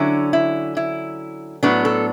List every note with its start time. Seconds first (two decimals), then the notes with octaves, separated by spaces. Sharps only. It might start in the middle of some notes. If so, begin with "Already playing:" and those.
Already playing: D3 F#3 C#4 E4
0.33 E4
0.77 E4
1.63 A2 F#3 B3 D4 F#4
1.85 A4